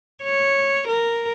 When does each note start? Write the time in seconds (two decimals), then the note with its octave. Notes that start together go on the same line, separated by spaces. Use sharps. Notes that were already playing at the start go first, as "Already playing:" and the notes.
0.23 C#5
0.88 A#4